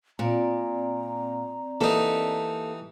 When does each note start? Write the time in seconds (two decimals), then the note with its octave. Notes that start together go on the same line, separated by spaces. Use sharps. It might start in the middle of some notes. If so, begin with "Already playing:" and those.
0.19 A#2 C4 D5 A#5
1.81 E3 A#3 D#4 G4 A4